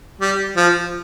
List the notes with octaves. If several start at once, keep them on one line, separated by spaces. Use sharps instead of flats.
G3
F3